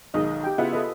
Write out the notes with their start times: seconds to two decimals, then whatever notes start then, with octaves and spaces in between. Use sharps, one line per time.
0.14 B1 D#3 G#3 D#5
0.44 G4 G5
0.58 C#3 B3 E4 F4 F#5
0.73 A4 B4 D#5